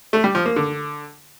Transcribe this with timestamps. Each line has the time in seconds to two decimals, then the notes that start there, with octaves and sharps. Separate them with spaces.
0.13 A3
0.24 G3
0.35 F3
0.46 A#3
0.56 D3